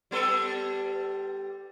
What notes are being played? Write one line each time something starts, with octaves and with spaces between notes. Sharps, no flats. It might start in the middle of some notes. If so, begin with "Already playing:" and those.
G3 B3 A4